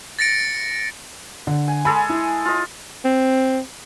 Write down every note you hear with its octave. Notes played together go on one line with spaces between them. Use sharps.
A6 A#6 C#7 D7
D3
G#5
G#3 A4 G#5 B5
E4
F4 D#5
C4